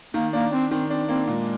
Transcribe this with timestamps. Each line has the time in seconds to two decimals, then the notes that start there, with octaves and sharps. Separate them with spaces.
0.14 D#3 A#3
0.33 A#3 D4
0.52 C4 D4
0.71 D#3 C4
0.90 C4 D4
1.09 A#3 C4
1.28 A#2 G#3